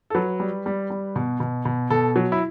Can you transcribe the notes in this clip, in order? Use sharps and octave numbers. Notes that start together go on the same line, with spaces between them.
A4
F#3 B4
G3
G3
G3
B2
B2
B2
B2 A4
F#3
E4